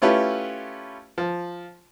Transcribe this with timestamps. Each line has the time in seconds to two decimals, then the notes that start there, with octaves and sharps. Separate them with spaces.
0.02 A3 C#4 E4 F4 G4 B4
1.18 F3